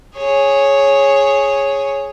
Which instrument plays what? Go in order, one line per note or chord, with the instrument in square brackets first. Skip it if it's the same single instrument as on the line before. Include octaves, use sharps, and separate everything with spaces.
[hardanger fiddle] G#4 C#5